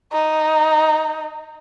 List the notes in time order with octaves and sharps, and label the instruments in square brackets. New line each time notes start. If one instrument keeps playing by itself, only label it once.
[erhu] D#4